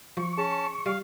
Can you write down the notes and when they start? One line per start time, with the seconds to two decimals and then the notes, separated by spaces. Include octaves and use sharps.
0.17 F3 C#6
0.38 C#4 G#4 A5
0.86 G3 F5